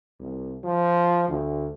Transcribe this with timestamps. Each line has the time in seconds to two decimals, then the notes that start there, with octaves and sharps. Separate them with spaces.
0.20 C2
0.64 F3
1.28 D2